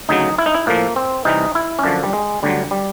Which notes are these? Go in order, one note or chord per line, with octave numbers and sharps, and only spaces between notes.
D2 C#3 F#3 D#4
E4
D#4
E4
A2 F3 A#3
C4
C2 C3 E3 G3 D#4
E4
C#4
F#2 D3 F3 D4
G3
G#3
D2 D3 F#3 G3
G3